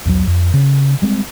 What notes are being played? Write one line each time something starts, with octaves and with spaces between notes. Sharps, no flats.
B1 E2 D#3 F#3
F2
C#3
G3 G#3 C4